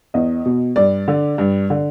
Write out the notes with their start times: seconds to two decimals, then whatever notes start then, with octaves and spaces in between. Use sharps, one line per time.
0.14 E2 D#5
0.46 B2
0.76 G2 D5
1.08 D3
1.38 G2
1.70 D3